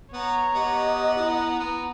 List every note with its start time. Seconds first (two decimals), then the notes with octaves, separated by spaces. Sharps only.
0.13 B3 C#5 A#5
0.54 B3 G4 D#5
1.18 E4 A#5
1.60 B3